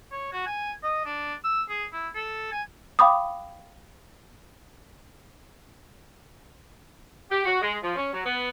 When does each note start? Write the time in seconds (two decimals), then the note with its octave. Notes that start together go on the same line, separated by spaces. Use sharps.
0.12 C#5
0.32 F#4
0.46 G#5
0.83 D#5
1.05 D4
1.44 E6
1.70 G#4
1.92 E4
2.15 A4
2.52 G#5
2.99 F5 G5 B5 D6 D#6
7.30 G4
7.45 F#4
7.61 G#3
7.82 F3
7.96 C#4
8.13 F#3
8.25 B3